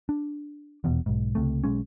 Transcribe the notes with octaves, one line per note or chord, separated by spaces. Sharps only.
D4
D#1 E2 B2
B1 G#2
C#2 C3 A3
B1 G#3 C#4